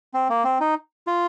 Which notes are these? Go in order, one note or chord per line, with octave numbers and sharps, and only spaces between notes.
C4
A#3
C4
D#4
F4